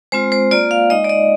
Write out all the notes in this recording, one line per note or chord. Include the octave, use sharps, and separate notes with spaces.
G#3 C4 F4 C5
C5
A#3 F4 D5
F5
G#3 D#4 D#5
D5
D#5